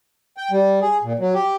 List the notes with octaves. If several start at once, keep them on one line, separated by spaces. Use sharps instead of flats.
G5
G3
G#4
A#2
F#3
G4